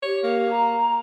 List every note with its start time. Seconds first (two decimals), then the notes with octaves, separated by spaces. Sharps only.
0.03 G4 C#5
0.24 A#3
0.49 A#5